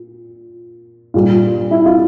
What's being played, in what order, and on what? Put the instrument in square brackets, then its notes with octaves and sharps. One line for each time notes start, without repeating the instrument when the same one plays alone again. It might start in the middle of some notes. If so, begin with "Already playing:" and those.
Already playing: [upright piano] A#2
A#2 G3 F4
E4
F4